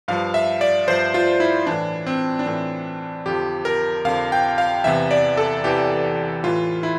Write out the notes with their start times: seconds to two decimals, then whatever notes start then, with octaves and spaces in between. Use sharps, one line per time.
0.08 G2 F3 F5
0.34 E5
0.61 D5
0.88 G2 F3 C5
1.14 F4
1.40 E4
1.67 A2 E3 D4
2.07 C4
2.39 D4
2.46 A2 E3 C4
3.26 F2 D3 F3 G4
3.65 A#4
4.05 F2 D3 F3 F5
4.32 G5
4.58 F5
4.84 E2 C3 E3 E5
5.11 D5
5.37 A4
5.64 E2 C3 E3 G4
6.44 A2 E3 F4
6.83 E4